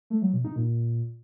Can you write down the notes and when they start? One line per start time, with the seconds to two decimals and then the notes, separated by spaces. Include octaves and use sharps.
0.10 A3
0.22 F#3
0.33 B2
0.45 D#4
0.56 A#2